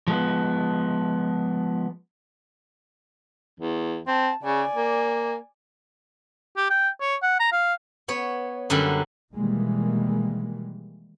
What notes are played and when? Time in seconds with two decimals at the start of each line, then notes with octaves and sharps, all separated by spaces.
0.08 F3 G#3 B3
3.60 E2
4.07 C4 A5
4.43 C#3 D5 G#5
4.76 A#3
6.57 G4
6.70 G5
7.01 C#5
7.22 F#5
7.40 A#5
7.52 F5
8.08 B3 C#5
8.70 F#2 D3 F#3 G3
9.33 B2 D#3 E3 G3 G#3 A#3